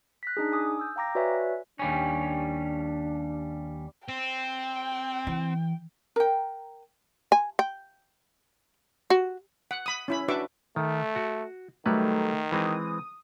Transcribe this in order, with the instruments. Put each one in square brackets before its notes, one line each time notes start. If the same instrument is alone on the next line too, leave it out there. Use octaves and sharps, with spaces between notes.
[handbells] F#6 A#6 B6
D4 D#4 G#4
G#5 D6 D#6
E6 G6
F5 G5 A#5 D6 A#6
F#4 B4 C#5 D5 E5 G#5
[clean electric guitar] D#2 G3 C#4 [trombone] D4
[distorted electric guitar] C4 [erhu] G5
[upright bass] E3
[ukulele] A#4 G5
[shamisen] G#5
G5
F#4
[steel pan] F#5
B5 D#6
C#4 E4 B5
D4 F#4 B4 E5 C#6 D6
[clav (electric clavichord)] D#3 [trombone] A3
[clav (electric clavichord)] F#4
[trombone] D#3 [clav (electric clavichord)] F#3 G3 B4 [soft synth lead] A3
[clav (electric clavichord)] E3 G#3 C4 [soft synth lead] D#6